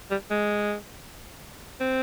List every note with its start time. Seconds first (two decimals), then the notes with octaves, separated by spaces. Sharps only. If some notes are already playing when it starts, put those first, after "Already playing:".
0.11 G3
0.30 G#3
1.80 C4